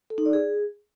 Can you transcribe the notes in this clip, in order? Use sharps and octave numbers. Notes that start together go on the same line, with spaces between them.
A4
D#4
D5
G#4